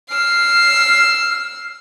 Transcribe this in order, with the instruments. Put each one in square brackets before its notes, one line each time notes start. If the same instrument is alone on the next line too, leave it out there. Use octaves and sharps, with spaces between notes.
[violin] E6 C7 [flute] F6